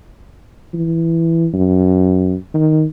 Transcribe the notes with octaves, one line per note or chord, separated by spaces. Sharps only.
E3
F#2
D#3